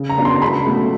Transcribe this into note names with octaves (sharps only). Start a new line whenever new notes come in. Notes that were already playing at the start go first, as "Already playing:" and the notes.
Already playing: C#3
A#5
F#3 B3 D4 F4
C6
A#5
C#2 B5
B2 F#3 A3